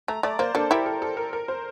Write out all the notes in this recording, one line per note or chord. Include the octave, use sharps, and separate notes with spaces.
A3 A#5
A3 D5
A#3 C5
A#3 D4 A4
E4 G4 A#4
A4
A4
A#4
A#4
C5